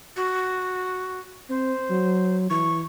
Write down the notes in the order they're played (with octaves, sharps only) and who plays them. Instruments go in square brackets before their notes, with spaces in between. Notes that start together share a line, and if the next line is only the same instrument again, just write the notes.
[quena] F#4
[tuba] C4 [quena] C5
[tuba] F#3
[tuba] E3 [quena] C#6